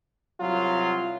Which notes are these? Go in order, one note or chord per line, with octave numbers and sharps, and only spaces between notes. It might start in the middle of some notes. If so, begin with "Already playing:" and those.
C2 F#3 F4